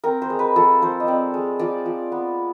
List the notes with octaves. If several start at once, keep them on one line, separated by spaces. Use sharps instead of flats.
C4 A#4
C5
G#3
B4
F3 A4
F3 C5
D#5
C4 D5
G#3
F3 D5
F3
B3